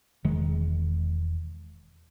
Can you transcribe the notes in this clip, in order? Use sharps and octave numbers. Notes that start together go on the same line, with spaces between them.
E1 D#3 G#3